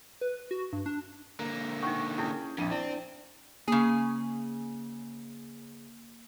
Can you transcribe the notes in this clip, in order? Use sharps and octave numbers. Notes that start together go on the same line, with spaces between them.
B4
F#4
G2
D4
D3 A#3 A#5
D#4 F#5 G5 C#6
C#4 E4 G#4 G5
A#1 F2 D4 D#7
C4 E4 D5
C#3 A#3 G#4